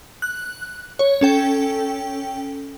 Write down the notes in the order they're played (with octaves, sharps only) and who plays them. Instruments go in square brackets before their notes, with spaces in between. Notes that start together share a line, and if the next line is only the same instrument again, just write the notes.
[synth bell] F#6
C#5
C#4 A4 G5